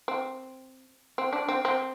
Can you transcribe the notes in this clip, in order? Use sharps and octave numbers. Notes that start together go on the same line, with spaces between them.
C4
C4
D4
C4
C4